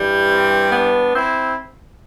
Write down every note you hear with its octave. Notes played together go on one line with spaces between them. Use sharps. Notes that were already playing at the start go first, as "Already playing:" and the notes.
Already playing: G2 E3 G3
C4
B3 D4
C4 E4